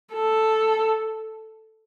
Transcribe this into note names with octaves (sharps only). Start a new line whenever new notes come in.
A4